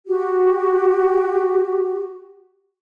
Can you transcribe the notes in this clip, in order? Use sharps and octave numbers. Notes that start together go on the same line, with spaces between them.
F#4 G4